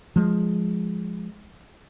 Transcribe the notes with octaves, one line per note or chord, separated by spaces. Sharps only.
F3 G#3